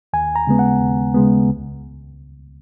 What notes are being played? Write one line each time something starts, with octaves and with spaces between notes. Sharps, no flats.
D#2 G#5
A#5
C#3 G#3 B3
F#5
D#2
C#3 G#3 B3
C#2